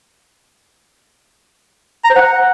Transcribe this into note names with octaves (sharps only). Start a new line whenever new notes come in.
A#5
C5
F#5